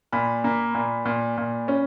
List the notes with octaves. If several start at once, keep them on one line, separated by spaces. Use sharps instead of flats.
A#2 B5
A#3
A#2
A#2
A#2
C#4